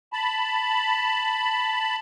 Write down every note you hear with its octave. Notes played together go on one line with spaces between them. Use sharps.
A5 B5